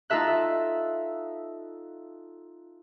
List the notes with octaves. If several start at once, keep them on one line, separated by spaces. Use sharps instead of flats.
D#4 F4 A4 E5 F#6